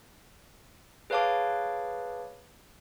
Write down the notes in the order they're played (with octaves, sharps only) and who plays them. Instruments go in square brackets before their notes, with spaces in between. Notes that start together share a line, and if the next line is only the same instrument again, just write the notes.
[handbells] G#4 B4 C#5 F5 A5 D6